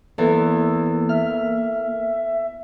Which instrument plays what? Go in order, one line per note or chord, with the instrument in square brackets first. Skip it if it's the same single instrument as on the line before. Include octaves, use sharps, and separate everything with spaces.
[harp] E2 E3 A4 [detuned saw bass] A#3
[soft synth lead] E5 [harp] F6